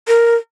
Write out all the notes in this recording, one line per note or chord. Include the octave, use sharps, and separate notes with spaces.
A#4